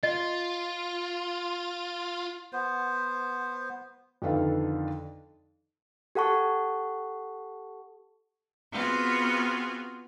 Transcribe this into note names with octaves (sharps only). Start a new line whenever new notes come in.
F4 D#5
B3 C5
F2 D3 D#3 A4 B4 F5
G4 A4 F#5 A5 C#6
B3 C4 F4 F#4 G#4